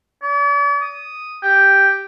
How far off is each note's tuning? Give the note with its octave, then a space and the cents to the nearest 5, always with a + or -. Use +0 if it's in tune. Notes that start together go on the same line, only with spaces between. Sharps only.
D5 -45
D#6 +0
G4 +0